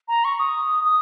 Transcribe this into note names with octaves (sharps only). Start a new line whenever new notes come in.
A#5
C#6
D#6
D#6